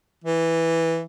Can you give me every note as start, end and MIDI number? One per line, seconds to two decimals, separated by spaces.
0.24 1.03 52